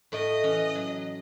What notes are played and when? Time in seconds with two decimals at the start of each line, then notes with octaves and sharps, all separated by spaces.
0.12 A2 A3 D5 D#5
0.43 E3 C#4
0.75 F#3